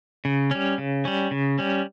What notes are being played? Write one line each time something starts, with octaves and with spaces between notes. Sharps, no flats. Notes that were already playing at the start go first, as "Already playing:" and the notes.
C#3
G3 C#4
C#3
G3 C#4
C#3
G3 C#4